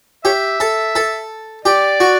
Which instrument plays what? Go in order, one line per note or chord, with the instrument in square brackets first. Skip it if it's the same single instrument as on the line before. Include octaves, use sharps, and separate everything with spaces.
[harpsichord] G4 [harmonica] C#5 E5
[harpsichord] A4
A4
[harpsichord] G4 [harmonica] D5
[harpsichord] F#4